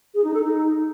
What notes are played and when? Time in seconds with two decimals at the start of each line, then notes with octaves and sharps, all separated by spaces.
0.15 G#4
0.24 D#4
0.34 A4
0.44 D#4